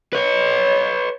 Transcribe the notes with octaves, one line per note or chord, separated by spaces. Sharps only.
B4 C#5